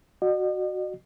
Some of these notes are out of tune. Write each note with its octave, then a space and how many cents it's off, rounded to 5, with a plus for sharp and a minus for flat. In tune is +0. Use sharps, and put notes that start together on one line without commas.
F#4 +0 D#5 -45